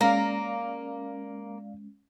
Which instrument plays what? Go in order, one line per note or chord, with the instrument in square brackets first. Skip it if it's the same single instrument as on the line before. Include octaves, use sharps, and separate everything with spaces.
[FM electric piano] G#3 C#4 [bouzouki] A#3 [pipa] A#4 [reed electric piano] D5 F5